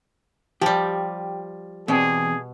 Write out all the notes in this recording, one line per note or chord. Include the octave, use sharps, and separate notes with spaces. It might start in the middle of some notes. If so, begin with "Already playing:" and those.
F3 G3 G4
E2 B2 C4 G#4 D5